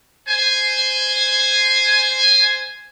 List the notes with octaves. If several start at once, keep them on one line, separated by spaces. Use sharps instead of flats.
C5 G#5